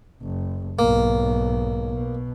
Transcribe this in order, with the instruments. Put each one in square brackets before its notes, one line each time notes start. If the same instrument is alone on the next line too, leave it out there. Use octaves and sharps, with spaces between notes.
[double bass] F#1
[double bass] B1 G#2 [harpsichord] A#3
[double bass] B2